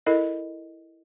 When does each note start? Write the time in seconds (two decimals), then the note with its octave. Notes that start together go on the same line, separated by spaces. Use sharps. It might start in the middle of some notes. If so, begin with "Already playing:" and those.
0.06 E4 A4 A#4 D#5